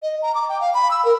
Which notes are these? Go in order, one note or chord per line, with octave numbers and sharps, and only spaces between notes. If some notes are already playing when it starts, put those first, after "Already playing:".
D#5
A#5
D6
G5
F5
B5
E6
A#4